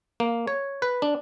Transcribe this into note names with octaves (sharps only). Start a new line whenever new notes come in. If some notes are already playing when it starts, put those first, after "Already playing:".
A#3
C#5
B4
D4